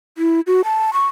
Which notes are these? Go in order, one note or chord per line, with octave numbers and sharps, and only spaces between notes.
E4
F#4
A5
C#6